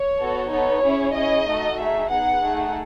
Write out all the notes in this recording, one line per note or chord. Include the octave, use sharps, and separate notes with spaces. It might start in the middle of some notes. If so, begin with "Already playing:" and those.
Already playing: C#5
B3 F#4 A4
B3 D#4 A4 C#5
C#4 E4 G#4
C#4 E4 G#4 D#5
A3 D#4 F#4 A4
A3 D#4 G#4 E5
B3 D#4 G#4 F#5
A3 D#4 G#4